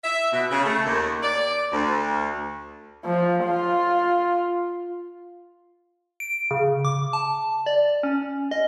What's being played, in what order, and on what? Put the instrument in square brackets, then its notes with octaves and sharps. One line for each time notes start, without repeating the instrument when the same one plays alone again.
[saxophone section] E5
B2
C#3
A3
D#2
D5
D2
[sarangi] F3
F4
[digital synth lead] D7
C#3
D6
A5
D5
C#4
D#5